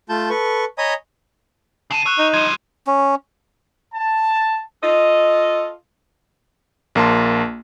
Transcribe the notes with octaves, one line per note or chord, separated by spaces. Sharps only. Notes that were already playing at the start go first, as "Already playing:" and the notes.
A3 F4 A5 G6
A4 B4 C#6
C#5 D#5 G#5 A#5 B5 D#6
C#3 A5 C7 D#7
C#5 E6 F#6 E7
D#4
F3 G3 G#6 E7
C#4
A5
F4 A4 D#5
A#1 A#3 A5 C6